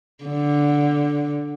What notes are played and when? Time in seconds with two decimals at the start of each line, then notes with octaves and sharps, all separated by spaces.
0.24 D3